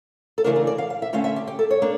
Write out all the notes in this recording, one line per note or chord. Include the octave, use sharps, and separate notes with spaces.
A4
C#3 E3 A3 D4 A#4
A#4
D5
F5
F5
E5
D3 A3 C#4 F5
E5
G4
G4
A4
C#5
A#3 D4